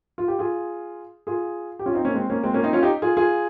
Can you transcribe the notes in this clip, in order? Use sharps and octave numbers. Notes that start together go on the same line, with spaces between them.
F4
G4
F4 G#4
F4 G#4
G4
C#4 F4
C4 D#4
A#3 C#4
G#3 C4
A#3 C#4
G#3 C4
A#3 C#4
C4 D#4
C#4 F4
D#4 G4
F4 G#4
F4 G#4